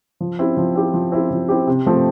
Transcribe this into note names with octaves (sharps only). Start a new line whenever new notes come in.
F3
C4 E4 G4
F3
C4 E4 G4
F3
C4 E4 G4
F3
C4 E4 G4
C3
F3 A3 C4